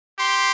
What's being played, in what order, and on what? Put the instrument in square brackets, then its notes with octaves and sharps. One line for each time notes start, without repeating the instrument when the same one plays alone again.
[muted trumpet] G4 [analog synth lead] C6